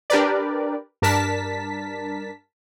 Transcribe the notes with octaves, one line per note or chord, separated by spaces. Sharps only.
D4 G4 A#4 B4 D5
G2 D4 A#4 A5 B6